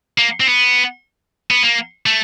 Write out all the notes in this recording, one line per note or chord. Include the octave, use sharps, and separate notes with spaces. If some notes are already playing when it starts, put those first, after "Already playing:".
A#3
C4
B3
B3
A#3
A3